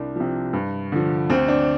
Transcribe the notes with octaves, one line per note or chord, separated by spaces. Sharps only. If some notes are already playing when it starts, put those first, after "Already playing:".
Already playing: C2 D4
C3 F3
G2
D3 F3
D2 C4
D4